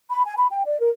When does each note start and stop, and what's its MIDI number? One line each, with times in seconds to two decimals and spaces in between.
0.11 0.25 83
0.25 0.34 80
0.37 0.47 83
0.51 0.63 79
0.66 0.78 74
0.80 0.90 70